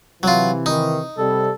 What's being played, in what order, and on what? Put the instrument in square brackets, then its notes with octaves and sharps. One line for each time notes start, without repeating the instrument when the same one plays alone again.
[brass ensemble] C3 E3 [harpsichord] F#3 F4
[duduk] D#3 [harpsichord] D#4
[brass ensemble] C3 G3 [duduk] A4